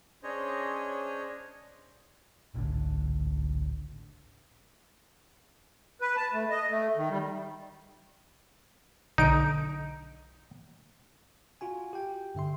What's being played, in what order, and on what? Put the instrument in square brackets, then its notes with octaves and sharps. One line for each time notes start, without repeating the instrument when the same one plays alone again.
[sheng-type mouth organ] C#4 D4 G#4 C5 C#5 D#5
[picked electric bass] G#1 C#2 A2 D3
[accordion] B4
A5
A3
D#5
A3
D#3
G3
[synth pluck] B1 D3 D7 [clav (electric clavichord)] D#4
[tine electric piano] F4 F#4 G#5
G4 G5
G2 D3 E5 C6